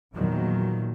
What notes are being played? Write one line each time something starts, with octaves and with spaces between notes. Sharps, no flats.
E2 A#2 D#3 F3 F#3